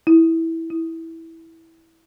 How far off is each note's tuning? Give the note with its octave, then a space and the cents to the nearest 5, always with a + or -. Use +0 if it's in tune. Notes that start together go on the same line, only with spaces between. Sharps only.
E4 -10
E4 -10